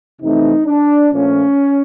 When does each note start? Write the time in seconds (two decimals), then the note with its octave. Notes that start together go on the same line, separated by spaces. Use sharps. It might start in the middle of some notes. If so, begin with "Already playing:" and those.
0.20 F2 C3 E3 A3 C4 D#4
0.66 D4
1.12 A#2 F3 A3 C#4